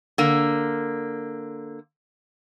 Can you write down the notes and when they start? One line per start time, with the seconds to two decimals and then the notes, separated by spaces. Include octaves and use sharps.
0.18 D3 A#3